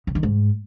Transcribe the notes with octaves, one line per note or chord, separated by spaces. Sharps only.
C#3
D#3
G#2